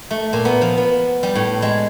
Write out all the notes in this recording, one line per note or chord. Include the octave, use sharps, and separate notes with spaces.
A3
A#2
B3
F3
B3
G3
A2
G#3